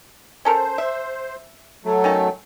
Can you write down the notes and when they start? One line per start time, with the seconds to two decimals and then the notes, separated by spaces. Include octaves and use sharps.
0.45 C#4 A4 A#4 C5
0.78 E5
1.85 F#3 A3
2.04 D#3 C#4 A4